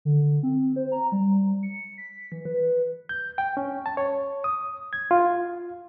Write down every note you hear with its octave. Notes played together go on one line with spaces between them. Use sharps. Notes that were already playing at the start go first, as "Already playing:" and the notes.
D3
C4
C5
A#5
G3
C#7
B6
E3
B4
G6
G5
C#4
A5
C#5
D#6
G#6
F4